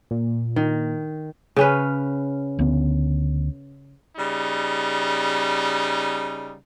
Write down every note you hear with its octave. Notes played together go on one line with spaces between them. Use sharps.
A#2
D#3
C#3 C#4 B4
D2 B3
C#3 G3 D#4